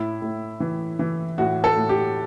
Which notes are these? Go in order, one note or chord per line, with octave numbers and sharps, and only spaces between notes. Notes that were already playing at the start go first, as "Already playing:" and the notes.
Already playing: A2 E4
A2
E3
E3
A2 F#4
A4
A2
G4